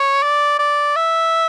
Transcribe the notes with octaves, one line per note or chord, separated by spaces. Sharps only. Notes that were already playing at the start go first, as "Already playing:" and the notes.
Already playing: C#5
D5
D5
E5